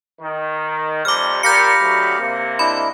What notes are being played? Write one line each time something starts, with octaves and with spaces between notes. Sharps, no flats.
D#3
F2 C3 G3 D6 F6
A#2 G4 A#4 F5 B5 G6 A#6 C#7
D2 F#3
C3 A#3
D4 E4 D#5 B5